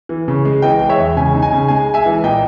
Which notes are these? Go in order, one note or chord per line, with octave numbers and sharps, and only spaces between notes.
E3
C#3
G#3
E3 D#5 G5
G#3 G5
C#5 E5
E2
C#3 G#5
D#4
G#5
C#3
G#3 G#5
G#3
E5 G#5
E3
A#2 D#5 G5